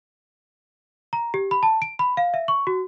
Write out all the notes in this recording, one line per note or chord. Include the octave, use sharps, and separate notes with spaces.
A#5
G4
B5
A5
D7
B5
F5
E5
C#6
F#4